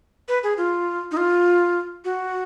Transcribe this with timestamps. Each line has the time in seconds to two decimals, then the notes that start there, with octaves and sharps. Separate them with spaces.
0.28 B4
0.43 G#4
0.57 F4
1.11 D#4
1.17 F4
2.05 F#4